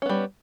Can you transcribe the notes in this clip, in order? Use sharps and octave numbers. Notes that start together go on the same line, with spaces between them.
G3 B3 C#4